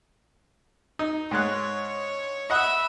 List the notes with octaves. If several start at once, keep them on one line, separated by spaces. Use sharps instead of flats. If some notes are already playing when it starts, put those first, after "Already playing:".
D#4
G#2 G#3 C#5 F#6
D#5 E5 F#5 B5 D#6